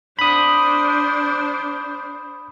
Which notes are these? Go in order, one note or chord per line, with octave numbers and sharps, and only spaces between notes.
D4 C5 B5 D#6